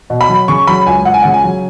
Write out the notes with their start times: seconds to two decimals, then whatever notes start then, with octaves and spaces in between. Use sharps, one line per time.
0.10 B2
0.21 B5
0.29 F#3
0.48 C#3 C#6
0.67 F#3 B5
0.86 C#2 G#5
1.05 C#2 F#5
1.14 G#5
1.22 C#3 F#5
1.34 G#5
1.44 F#3